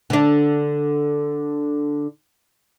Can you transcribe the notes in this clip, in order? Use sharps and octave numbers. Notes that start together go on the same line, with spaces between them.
D3 D4